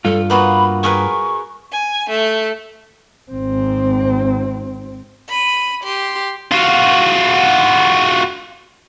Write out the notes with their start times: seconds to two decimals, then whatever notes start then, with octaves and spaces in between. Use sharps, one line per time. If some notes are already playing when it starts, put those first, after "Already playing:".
0.05 G2 F4 A4
0.30 A#3 B3 F#4 B5
0.83 G#4 A#4 B4 C#6
1.71 G#5
2.07 A3
3.31 G#1 C4
5.28 B5 D#7
5.84 G4 C6
6.51 F4 F#4